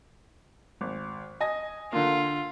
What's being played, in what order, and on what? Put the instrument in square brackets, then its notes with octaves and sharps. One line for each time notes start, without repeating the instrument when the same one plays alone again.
[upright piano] G#1
D#5 G#5 A#6
[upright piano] D3 A#3 [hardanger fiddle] F4